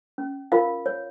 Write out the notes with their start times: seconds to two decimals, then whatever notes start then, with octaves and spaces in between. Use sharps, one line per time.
0.18 C#4
0.52 F4 A#4 F5
0.86 C#5